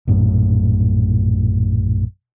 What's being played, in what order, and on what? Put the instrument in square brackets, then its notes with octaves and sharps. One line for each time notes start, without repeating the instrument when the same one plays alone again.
[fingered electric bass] A#1 F#2 A2